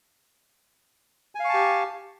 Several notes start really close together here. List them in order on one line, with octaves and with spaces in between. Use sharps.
G#5 F5 C#6 A5 G4